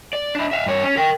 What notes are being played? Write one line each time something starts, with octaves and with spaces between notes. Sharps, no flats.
D5
D4 E4
E5 F5
G2 C#5
C#4
A#4 G5